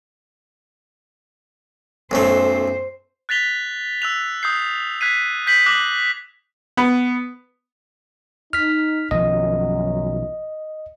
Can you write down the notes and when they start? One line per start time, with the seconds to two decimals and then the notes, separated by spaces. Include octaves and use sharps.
2.11 B1 F#2 A3 C5
3.29 F#6 A6 B6 F7 G7
4.02 E6 F#6 F7
4.43 D#6 G6 C7
5.01 F#6 G#6 B6 C7 D#7
5.47 G6 B6 C7 F#7
5.66 D6 D#6 F#6 G6 A#6 F#7
6.77 B3
8.53 D#4 F6 B6
9.11 B1 F#2 D#3 F3 D#5